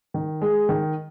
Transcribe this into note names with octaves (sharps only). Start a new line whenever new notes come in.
D#3
G#3
D#3